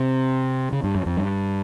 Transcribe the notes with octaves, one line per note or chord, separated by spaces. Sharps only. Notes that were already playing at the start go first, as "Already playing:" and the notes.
Already playing: C3
C#3
G2
F#2
F2
G2